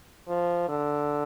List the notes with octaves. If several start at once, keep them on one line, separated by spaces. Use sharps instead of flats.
F3
D3